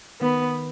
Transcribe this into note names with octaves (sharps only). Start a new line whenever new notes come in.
D#3 B3